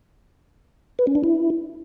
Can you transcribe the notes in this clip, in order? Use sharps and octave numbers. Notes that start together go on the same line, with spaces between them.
B4
C#4
D4
E4